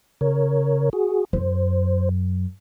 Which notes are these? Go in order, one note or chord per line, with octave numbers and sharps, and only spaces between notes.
C#3 A#4 C#5
F#4 G#4
F#2 C5